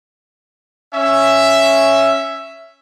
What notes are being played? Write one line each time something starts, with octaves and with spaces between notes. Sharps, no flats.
C#4 E5